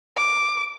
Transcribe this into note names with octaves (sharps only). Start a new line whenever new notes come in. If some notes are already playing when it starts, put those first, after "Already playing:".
D6